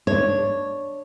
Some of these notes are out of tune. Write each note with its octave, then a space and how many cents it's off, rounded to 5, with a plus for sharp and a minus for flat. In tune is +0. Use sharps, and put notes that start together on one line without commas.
D4 +0 C#5 -5